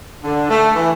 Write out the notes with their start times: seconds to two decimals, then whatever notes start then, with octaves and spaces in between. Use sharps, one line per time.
0.23 D3
0.50 A3
0.75 E3